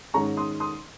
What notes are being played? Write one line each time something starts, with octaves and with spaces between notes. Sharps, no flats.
G#2 D#3 G#3 C#4 A#5 C#6
C6 D#6
C6 D#6